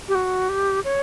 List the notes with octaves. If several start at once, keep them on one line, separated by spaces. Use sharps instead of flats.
G4
F#4
G4
C#5